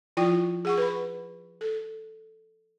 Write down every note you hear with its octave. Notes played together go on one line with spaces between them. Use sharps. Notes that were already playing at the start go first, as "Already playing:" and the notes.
F3 E4 F4 D5 G5
G#4 F#5 C#6
B4 B5
A4